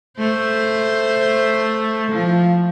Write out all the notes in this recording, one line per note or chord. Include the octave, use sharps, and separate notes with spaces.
A3 C5
F3